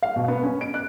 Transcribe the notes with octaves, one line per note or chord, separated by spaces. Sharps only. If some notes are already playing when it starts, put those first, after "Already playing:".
F5
B2
B3
C#4
D7
F#6